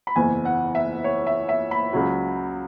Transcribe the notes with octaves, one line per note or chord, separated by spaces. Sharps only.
B5
F#1 E2 E3 G#5
F#5
E5
C#5
E5
E5
B5
C#2 C#3 F#3